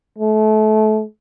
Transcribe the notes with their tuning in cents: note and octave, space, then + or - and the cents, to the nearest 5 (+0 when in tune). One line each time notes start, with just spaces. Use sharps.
A3 -30